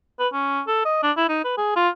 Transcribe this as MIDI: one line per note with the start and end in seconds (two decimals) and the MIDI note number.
0.19 0.28 71
0.33 0.62 61
0.67 0.82 69
0.85 1.00 75
1.03 1.12 62
1.17 1.28 64
1.29 1.39 63
1.44 1.57 71
1.57 1.75 68
1.76 1.89 65